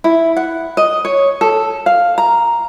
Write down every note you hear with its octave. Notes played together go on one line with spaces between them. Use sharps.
E4
F#5
D#5
C#5
A4
F5
A#5